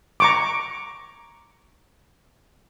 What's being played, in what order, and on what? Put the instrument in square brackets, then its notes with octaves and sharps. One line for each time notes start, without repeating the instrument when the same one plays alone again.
[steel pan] A#5 C#6 D6